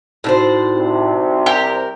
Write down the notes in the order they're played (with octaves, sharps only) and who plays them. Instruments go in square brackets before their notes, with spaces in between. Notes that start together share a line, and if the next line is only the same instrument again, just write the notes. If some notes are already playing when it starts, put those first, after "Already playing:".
[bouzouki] A2 D4 C5 [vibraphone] D#4 F#4
[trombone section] C2 C3
[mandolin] G4 [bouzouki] A#4